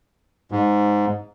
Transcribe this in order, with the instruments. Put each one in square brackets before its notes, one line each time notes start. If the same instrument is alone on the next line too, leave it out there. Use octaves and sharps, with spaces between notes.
[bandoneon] G#2